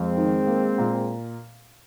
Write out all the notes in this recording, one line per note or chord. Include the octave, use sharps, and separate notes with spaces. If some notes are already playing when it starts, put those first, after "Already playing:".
Already playing: F2 G#3 C4
D#3
A#3
A#2